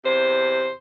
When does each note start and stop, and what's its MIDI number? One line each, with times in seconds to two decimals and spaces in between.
0.05 0.71 40
0.05 0.71 48
0.05 0.71 72